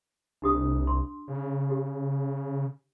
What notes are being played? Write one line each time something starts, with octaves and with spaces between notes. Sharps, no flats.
C2 D4 G4 D#6
C6
C#3
G4